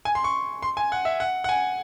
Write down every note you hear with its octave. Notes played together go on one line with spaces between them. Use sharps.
G#5
C6
C#6
C6
G#5
F#5
E5
F#5
F#5
G#5